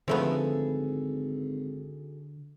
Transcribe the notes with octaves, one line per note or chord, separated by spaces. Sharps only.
G#1 D3 F3 A3 B3 F#4 G#4 A4